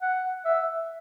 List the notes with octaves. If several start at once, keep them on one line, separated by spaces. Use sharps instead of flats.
F#5
E5